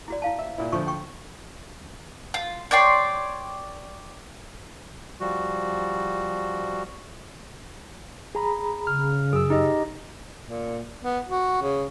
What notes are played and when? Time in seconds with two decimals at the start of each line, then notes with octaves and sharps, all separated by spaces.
0.08 E4 F#4 D5
0.22 E4 F5 A5
0.39 E5
0.58 A#2 E4
0.72 D2 F3 C#6
0.87 G5 C#6
2.34 F4
2.71 C#5 D5 G5 C6
5.20 F3 G3 F#4
8.35 G#4 A#5 B5
8.87 C#3 F6
9.33 F#2 G#4 E6
9.50 D#4 G4 D#5
10.46 A#2
11.03 B3
11.28 F#4
11.62 C#3